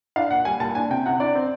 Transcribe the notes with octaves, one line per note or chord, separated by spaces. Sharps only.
D4 F5
A#2 F#5
G3 G#5
A#2 A5
D4 G#5
C3 G5
C3 F#5
D4 D5
C4